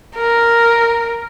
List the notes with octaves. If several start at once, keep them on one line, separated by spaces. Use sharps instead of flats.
A#4